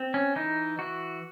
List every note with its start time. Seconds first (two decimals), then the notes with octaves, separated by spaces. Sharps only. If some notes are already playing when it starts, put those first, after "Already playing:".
Already playing: C4
0.14 C#4
0.36 E3 D#4
0.79 E3 F#4